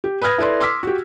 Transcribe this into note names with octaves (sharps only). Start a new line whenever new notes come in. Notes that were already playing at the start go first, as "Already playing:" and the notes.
G4
B4 B5 D#6 F6 G#6 A#6
E4 A4 B4 D5 C6
C6 D6 E6 F6 B6
F#4 G4